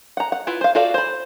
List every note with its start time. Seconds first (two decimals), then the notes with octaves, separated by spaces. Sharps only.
0.17 F#5 A#5
0.32 F#5
0.47 E4 F4 B4
0.61 C5 F5
0.75 F4 F#4 A4 D5 F5
0.94 C5 B5